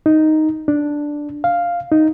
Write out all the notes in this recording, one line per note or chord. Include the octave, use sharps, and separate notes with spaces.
D#4
D4
F5
D#4